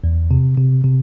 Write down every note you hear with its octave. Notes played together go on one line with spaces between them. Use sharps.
E2
C3
C3
C3